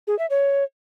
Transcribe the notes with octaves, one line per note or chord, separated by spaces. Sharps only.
G#4
E5
C#5